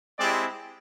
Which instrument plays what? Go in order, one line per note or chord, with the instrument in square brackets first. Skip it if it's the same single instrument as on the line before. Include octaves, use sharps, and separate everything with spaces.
[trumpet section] G#3 C4 E4 G4 D5